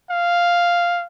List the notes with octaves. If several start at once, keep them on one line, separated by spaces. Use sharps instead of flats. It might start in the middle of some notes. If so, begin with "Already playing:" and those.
F5